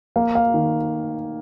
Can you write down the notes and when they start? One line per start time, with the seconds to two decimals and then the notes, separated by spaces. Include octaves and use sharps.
0.16 A#3 F5
0.35 F5
0.54 D#3